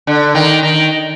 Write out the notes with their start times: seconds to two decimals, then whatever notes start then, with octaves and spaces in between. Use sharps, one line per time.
0.07 D3
0.35 D#3
0.63 D#3